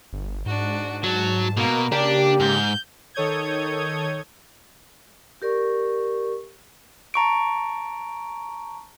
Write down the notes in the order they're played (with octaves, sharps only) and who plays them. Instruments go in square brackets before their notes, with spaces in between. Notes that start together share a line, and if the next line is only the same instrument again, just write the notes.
[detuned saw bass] G1
[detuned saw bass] G#2 [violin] D4 F#4
[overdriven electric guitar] F#3 [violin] A5
[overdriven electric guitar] B2 [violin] A#3 A#4
[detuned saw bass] C#3 [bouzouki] A#3 G4 [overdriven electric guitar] D4 [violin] D5
[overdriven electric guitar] G#2 [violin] G6
[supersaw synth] D#3 A4 C#5 D#6 G6 G#6
[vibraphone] G4 A#4 D5 C#6
[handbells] A5 A#5 C#6 D7